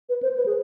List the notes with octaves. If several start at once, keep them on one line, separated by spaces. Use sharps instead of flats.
B4
C5
B4
G#4